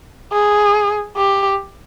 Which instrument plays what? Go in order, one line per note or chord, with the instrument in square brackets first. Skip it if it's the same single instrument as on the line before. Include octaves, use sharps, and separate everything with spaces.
[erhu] G#4
G4